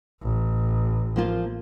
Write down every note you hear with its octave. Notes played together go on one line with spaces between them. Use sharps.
A1
F3 A#3 F4